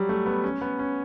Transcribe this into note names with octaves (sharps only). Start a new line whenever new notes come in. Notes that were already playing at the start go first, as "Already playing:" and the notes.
Already playing: F#3 G3
A3
B3
C#4
B3
C#4